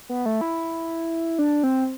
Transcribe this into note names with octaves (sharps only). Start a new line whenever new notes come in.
B3
A3
E4
D4
C4